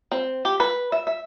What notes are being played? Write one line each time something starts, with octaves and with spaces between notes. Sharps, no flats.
C4
G4
B4
E5
E5